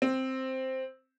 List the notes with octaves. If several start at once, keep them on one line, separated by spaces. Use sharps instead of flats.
C4